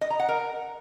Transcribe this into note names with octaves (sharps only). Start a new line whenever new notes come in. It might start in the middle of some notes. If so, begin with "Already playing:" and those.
D#5
A#5
F#5
A#4